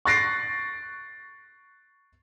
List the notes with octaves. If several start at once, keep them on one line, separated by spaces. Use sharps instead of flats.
C#6 F#6 A6 A#6 C7 D7